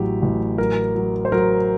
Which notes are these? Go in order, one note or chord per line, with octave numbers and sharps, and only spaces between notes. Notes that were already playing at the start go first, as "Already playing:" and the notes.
Already playing: A1 A2 F#3 G4
A1
F#3 A#4
F#3
C5
F#3 A#4